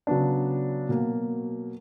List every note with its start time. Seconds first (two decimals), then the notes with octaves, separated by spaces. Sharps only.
0.07 C#3 F#3 B3 D4
0.89 B2 F#3 A#3